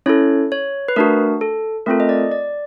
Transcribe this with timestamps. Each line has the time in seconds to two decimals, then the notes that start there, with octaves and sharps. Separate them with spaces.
0.06 C#4 E4 A4 C#5
0.52 C#5
0.88 B4
0.96 A3 D4 F#4 A#4
1.41 A4
1.86 A3 C4 F4 A4 A#4
2.00 D#5
2.09 D5
2.32 D5